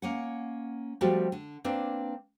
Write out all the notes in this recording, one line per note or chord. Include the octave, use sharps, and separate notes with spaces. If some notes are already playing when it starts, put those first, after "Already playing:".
A#3 C#4 F#5
F3 G3 A3 C4 F#4 G4
D3
A#3 C4 D4 B4